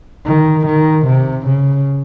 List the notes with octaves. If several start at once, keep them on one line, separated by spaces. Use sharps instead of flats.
D#3
D#3
C3
C#3